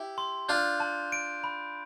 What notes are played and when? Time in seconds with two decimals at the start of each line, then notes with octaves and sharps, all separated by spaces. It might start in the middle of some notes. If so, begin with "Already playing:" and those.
Already playing: E4 G4
0.18 C6
0.49 D4 F4 G6
0.80 A5
1.12 D7
1.44 B5